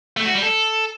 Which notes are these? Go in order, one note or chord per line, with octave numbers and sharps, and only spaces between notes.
A3
F#4
G3
A4